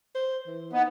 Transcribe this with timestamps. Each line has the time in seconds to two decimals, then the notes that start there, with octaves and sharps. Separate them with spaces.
0.15 C5
0.47 E3
0.73 B3 D#4